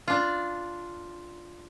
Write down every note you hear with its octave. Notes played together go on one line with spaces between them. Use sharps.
D4 F4